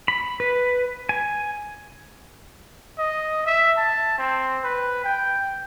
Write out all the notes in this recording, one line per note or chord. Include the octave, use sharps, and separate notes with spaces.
B5
B4
G#5
D#5
E5
A5
C4
B4
G5